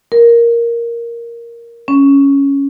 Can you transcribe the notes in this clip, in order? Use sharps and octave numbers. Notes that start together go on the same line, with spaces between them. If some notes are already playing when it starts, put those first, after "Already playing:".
A#4
C#4